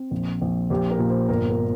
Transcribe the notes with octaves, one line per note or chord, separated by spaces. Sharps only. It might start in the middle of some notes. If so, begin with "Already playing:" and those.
Already playing: C4
A#1
A#1
A#1 G4
A#4
A#2
C5
G1 A#4
A#4